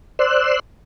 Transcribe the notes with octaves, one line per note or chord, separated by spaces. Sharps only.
C5 D5 C6 E6 F#6